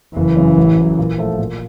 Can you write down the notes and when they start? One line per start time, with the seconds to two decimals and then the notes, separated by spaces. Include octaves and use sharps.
0.16 F#1 E3
0.37 F#2 C#3
0.57 A1
0.78 A2 F#3
0.98 A#2
1.18 F3 A3
1.39 A#2